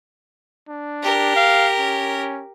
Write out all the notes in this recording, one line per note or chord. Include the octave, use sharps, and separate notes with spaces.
D4
G4 A#4
F5
C#4